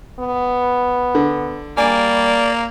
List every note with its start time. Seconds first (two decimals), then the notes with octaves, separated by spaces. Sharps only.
0.19 B3
1.15 D3
1.77 G3 A#3 D5 G#5